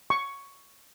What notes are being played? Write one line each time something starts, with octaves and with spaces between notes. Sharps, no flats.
C#6